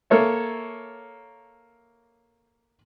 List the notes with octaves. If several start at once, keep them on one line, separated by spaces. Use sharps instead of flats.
A#3 A4 C#5 E5